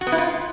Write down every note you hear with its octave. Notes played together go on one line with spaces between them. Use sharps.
F#4
B3
E4
F4